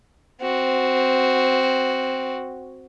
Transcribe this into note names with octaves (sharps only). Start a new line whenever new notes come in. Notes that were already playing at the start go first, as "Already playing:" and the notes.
C4 F#4